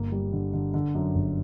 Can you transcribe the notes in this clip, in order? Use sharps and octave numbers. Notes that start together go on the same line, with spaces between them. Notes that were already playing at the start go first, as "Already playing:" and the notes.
Already playing: G1 A#3
G3
D3
D3
D3
F#2
G1